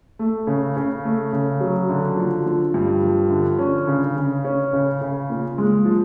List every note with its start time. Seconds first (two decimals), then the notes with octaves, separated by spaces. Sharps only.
0.19 A3
0.47 C#3
0.77 C#3
1.05 A3
1.33 C#3
1.60 F#3
1.89 D3
2.17 F3
2.46 F3
2.74 G2
3.03 F3
3.30 D3
3.59 C#4
3.87 C#3
4.16 C#3
4.45 C#4
4.73 C#3
5.01 C#3
5.30 A#2
5.58 G#3
5.85 F3